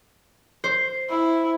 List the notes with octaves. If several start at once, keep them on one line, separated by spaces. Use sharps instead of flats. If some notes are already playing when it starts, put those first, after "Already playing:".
C5
E4